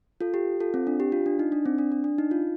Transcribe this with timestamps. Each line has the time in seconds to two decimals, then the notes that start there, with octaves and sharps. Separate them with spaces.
0.21 F4 A4
0.34 G4
0.60 F4 A4
0.74 C4
0.87 D4
1.00 G4
1.12 F4
1.26 D4
1.39 D#4
1.52 D4
1.66 C4
1.78 D4
1.92 D4
2.04 D4
2.18 D#4
2.31 F4